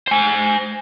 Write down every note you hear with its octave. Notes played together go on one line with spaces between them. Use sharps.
C5 G#5